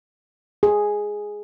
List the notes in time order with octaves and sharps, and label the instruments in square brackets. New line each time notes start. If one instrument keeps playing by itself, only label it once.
[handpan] G#4